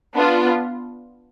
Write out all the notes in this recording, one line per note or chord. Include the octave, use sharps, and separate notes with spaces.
B3 D4 F4